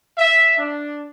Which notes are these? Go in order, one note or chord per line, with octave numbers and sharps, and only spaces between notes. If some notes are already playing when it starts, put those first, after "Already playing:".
E5
D4